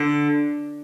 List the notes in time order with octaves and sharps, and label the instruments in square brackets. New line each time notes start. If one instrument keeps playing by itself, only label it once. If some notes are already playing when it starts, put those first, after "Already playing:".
Already playing: [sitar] D3